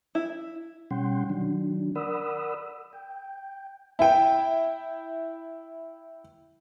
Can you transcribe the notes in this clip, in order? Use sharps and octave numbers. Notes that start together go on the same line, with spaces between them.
E4
B2 G3 C#4 F#5 G5 C6
D#3 F#3 D4
A#4 D5 F#5 B5 D#6 E6
G5
E4 G5